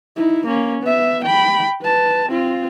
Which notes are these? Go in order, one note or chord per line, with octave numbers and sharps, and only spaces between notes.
D#4 E4
A#3 C#4
B3 E5
G5 B5
B4 A5
C4 F4